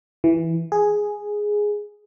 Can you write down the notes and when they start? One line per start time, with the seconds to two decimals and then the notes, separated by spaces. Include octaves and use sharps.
0.24 E3
0.72 G#4